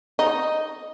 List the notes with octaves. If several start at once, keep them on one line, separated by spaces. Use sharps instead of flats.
D#4